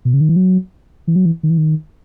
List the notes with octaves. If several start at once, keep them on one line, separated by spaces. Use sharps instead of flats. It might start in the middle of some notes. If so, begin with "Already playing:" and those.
B2
C#3
D#3
E3
F#3
E3
F#3
E3
D#3
E3
D#3